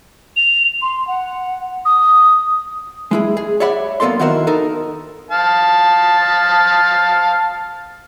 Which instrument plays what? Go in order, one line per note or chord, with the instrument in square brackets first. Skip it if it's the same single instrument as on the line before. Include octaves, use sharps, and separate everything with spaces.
[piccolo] F7
C6
F#5
D#6
[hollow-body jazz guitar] G#3 E4 G#4
G#4
C#5 D5 E5 F#5 B5
F#2 A#3 B3 A4 D5 C6
D#3 B3 E4 F#4 A#4 C5
D#4 A4 A#4
[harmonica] F5 A5